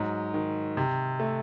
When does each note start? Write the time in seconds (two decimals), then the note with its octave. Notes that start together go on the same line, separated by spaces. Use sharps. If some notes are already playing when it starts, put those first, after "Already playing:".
Already playing: G#2 F#3
0.34 D#3
0.77 C3
1.20 A3